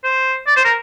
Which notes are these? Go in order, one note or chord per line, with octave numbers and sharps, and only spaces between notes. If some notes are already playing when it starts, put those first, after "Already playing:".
C5
D5
C5
A#4